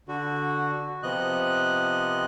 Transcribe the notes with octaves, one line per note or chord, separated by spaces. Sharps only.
D3 F#4
C3 F3 B3 D#5 F#6